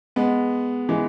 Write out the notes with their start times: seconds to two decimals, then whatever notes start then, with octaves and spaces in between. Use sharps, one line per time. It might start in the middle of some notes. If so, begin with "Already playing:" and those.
0.16 G#3 B3
0.89 E3 G#3